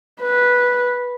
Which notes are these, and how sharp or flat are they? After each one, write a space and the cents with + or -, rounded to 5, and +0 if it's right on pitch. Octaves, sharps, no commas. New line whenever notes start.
B4 -10